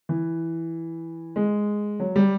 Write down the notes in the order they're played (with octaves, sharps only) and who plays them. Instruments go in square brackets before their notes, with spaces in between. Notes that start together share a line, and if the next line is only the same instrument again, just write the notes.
[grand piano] E3
G#3
F#3
G3